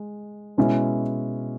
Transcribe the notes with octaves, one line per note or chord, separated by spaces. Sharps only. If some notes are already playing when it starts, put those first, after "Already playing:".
Already playing: G#3
B2 G#3 C#4 E4